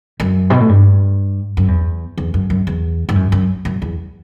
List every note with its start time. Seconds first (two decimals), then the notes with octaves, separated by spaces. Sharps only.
0.20 F#2
0.50 B2
0.60 A2
0.69 G2
1.57 F#2
1.68 E2
2.18 E2
2.34 F#2
2.50 F#2
2.67 E2
3.09 G2
3.16 F#2
3.32 F#2
3.65 F#2
3.82 E2